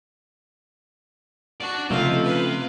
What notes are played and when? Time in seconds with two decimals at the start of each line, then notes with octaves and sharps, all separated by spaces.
1.60 D4 F#4 D5
1.91 C#3 F3 A3 C4 D#4 G4 F5
2.24 B4 F5